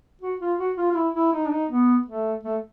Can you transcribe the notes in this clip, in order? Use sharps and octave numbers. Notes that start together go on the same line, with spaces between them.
F#4
F4
F#4
F4
F4
E4
E4
D#4
D4
D#4
B3
A3
A3